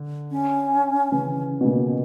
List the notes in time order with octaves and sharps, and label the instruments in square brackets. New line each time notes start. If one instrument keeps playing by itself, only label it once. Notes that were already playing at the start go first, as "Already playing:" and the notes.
Already playing: [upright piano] D3
[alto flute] C#4
[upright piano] C#3 E3
B2
A#2 C#3